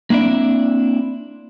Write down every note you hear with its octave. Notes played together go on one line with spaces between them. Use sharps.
A#3 C4 D4 E4 D5